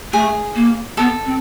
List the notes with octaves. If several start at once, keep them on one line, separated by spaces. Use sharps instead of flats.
A3 G#4
A#3
B3 A4
C4